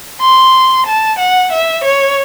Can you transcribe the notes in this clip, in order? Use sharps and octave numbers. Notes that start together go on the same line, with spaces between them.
C6
A5
F#5
E5
C#5